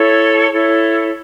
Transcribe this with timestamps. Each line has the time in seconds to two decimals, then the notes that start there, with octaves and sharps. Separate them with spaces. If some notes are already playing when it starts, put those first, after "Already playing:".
Already playing: E4 A4 C#5
0.51 E4 A4 C#5